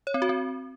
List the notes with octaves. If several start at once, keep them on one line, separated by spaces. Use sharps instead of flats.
C#5
C4
F#4
C4